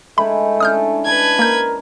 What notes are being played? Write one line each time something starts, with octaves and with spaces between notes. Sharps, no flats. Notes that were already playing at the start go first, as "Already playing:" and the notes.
G#3 A3 D#4 E4 B5
C#4 D4 A5 D#6 F6 G6
B4 A5 G#6
A#3 A#4 G6